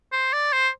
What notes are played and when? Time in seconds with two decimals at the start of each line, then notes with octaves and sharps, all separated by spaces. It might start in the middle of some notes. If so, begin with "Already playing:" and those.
0.12 C5
0.33 D5
0.53 C5